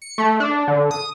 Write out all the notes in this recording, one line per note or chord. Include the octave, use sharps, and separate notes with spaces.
C#7
A3
D4
D3
D#6